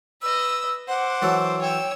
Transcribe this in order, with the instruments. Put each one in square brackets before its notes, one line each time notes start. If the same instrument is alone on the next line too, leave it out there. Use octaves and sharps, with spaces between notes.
[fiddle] B4 D#5 [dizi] E6
[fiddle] C5 D6 [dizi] F#5
[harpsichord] E3 F#3 A4
[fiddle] C#5 E6 [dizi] G5